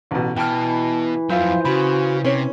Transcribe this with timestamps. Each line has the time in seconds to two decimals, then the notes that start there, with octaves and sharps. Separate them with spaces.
0.11 A1 B2
0.36 B2 E3 G5 A5 F6
1.30 F2 F#3 E4 F4 C5 E5 F5
1.65 C#3 F#4 B5
2.24 C3 C#4 C#5